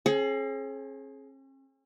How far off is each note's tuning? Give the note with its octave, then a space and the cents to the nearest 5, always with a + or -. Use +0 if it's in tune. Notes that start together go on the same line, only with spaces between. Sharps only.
C#4 -45 G#4 +25